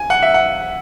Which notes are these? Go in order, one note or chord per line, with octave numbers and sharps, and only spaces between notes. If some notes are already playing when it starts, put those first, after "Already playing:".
Already playing: G#5
F#5
E5
F#5